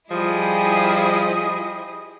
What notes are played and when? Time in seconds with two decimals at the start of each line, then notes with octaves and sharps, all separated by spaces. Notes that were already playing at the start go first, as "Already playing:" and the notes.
0.11 F3 G3 E4 G#4 D#5